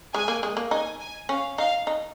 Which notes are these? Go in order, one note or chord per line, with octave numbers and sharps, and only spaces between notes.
G#3 G#5
A#3
G#3
A#3
D#4 G#5
G#5
C#4 F5
D#4 F5
D#4